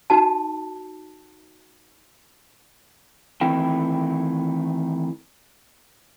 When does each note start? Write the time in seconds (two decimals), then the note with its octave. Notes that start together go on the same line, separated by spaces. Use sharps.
0.10 D#4 F#4 A5
3.41 D#3 E3 A3 C4 E4 G5